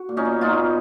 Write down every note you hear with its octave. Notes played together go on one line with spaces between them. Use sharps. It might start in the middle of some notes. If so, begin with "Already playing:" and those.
Already playing: F#4
A#2
C#4 D#4
B3
A#2 D#4 F4
B3